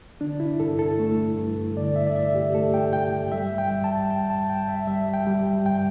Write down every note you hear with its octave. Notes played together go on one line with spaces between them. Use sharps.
D3 D4
E4
G2 A4
A4
A3
G2
D3 D5
E5
D5
G2 E5
G4
A3 A4
G5
G2 G5
G3 E5
G5
G3
A5
G2 G5
A5
G2 G5
E5
G3 E5
G5
G3
G2 G5